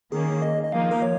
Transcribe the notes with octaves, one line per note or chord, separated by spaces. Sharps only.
D#3 A#3 C#4 G#4
D#5
D#5
F3 A#3 D#4 F5
A#4
C#5